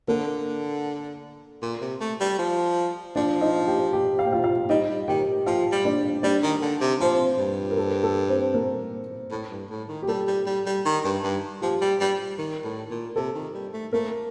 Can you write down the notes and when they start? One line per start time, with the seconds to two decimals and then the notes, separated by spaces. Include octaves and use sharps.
0.08 D3 A#3 A#4
1.62 A#2
1.81 C3
2.00 A3
2.20 G3
2.39 F3
3.16 F3 D4 D5
3.41 D#4 D#5
3.67 G4 G5
3.93 G4 G5
4.19 F5
4.25 G5
4.33 F4 F5
4.44 F4 F5
4.69 G3 D#4 D#5
4.89 G3
5.08 D#3 G4 G5
5.46 F3 F4 F5
5.72 G3
5.85 D4 D5
6.23 G3 D4 D5
6.43 D#3
6.62 D3
6.81 C3
7.00 F3 C4 C5
7.38 G2
7.71 A#4
7.77 A4
8.03 A4
8.29 C4 C5
8.54 A#3 A#4
9.31 A2
9.50 G2
9.70 A2
9.88 D#3
10.02 G4
10.08 G3 A4
10.27 G3
10.46 G3
10.66 G3
10.85 D#3
11.04 G2
11.23 G2
11.62 F3 G4
11.81 G3
12.00 G3
12.38 D#3
12.64 A2
12.90 A#2
13.16 C3 A4
13.35 D#3
13.54 G3
13.73 A3
13.93 A3 A#3 A#4